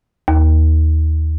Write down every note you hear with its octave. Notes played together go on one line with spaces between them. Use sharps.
D#2